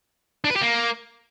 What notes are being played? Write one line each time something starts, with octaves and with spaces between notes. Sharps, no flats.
D4
B4
G4
A#3